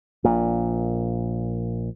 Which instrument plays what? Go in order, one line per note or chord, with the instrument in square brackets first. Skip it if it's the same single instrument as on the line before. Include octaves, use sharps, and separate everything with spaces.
[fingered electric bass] A#1 A#2